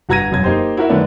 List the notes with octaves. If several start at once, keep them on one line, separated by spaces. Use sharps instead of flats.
G1 F#4 A#5 G#6 A#6 D#7
E1 F#2 G#6
A#3 D#4 G4 C5
E4 F#4 A#4 E5
F#2 D3 D#3 A3 B3 D4